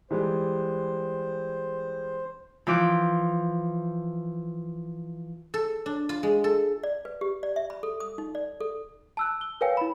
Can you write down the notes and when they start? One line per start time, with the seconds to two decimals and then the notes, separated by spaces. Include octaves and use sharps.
0.11 E3 G3 G#3 C5
2.67 E3 F3 D6 F#6
5.54 A4
5.86 D4
6.09 F4
6.23 G#3
6.44 A4
6.83 D5
7.05 B4
7.21 G4
7.43 D5
7.56 E5
7.70 B5
7.83 A4
8.00 D#6
8.18 D#4
8.35 D5
8.60 A4
9.17 A5 E6 F#6
9.41 G7
9.61 A#4 B4 C#5 F5 G5 G#5
9.77 E4 B5